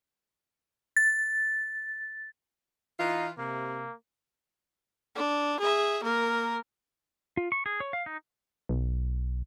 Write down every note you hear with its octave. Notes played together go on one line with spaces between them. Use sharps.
A6
E3 D#4 F4
C3 A#3
D4
G#4 E5
A#3 A#4
F4
C#6
G#4
C#5
F5
D#4
B1